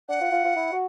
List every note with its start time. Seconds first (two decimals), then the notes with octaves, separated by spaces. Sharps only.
0.08 D4 F#5
0.21 F4
0.32 F4
0.45 F4
0.56 E4
0.72 F#4